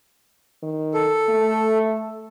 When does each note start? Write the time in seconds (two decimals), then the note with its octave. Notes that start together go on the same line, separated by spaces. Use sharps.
0.63 D#3
0.94 A4
1.28 A3